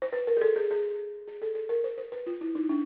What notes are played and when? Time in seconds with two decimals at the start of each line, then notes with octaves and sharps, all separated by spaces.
0.02 C5
0.12 B4
0.27 A#4
0.37 G#4
0.41 A4
0.56 G#4
0.71 G#4
1.28 G#4
1.42 A4
1.55 A4
1.69 A#4
1.84 C5
1.98 C5
2.12 B4
2.27 F4
2.41 E4
2.55 D#4
2.69 D4